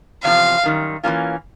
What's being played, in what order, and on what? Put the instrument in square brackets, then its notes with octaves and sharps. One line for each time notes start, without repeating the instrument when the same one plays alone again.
[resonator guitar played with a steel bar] E2 C3 F3 [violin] F5
[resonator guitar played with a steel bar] F#2 D#3 G3
E3 G3 A#3 C#4 F4